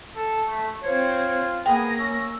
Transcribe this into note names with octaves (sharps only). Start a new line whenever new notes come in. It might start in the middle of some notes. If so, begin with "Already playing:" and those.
A4
A3
C4 F4 C5 C#5
A#3 B3 G#4 G5 A#6
C#4 E6